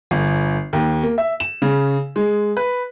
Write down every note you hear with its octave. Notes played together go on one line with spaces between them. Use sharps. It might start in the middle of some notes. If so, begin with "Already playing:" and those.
G1
D#2
A#3
E5
E7
C#3
G#3
B4